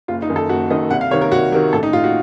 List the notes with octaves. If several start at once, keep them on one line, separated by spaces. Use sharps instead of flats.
F#1 F4
D#4
F#2 D#3
A4
F#1 F#4
F#2 D#3 D#5
C2 F#5
F5
C3 D#3 C#5
A#4
C2 F#4
C3 D#3 A#4
A1 A4
D#4
A2 F4
F#4